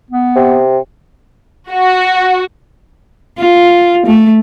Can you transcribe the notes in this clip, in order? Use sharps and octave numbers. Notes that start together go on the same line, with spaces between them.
B3
C3
F#4
F4
A3